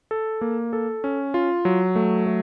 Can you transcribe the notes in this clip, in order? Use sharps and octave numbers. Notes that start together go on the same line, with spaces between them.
A4
A#3
A4
C#4
F4
F#3
A3
A3